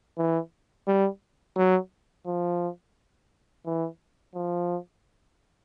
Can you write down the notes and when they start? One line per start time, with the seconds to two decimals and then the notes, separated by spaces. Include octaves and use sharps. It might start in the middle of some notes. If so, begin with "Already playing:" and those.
0.18 E3
0.87 G3
1.56 F#3
2.26 F3
3.66 E3
4.35 F3